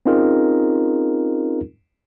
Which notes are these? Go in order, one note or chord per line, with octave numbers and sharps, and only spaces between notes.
C4 C#4 D#4 F4 G#4 A#4